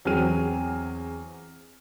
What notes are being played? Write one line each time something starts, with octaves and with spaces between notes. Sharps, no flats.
E2 F#3 C4 G#4 F6 D#7